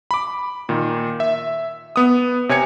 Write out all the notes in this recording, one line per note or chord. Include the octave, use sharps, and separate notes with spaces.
B5 D6
A#2 D#3
E5
B3 D#6
C3 C#5 G#5 G#6 C#7